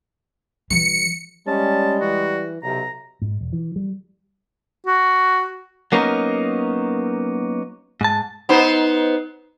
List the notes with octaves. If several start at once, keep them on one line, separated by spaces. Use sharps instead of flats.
E3 G3 C#7
G3 G#3 C#4 A5
E3 F#4
B1 C3 A#5
G#2
E1
E3
G3
F#4
F#3 A#3 B3 C#4 D#4 A#4
G#2 A5
B3 D#4 C5